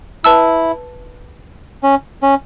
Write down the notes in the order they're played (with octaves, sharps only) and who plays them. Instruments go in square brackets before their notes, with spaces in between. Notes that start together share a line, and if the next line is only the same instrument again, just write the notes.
[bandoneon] E4 [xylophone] B4 A5 E6
[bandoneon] C#4
C#4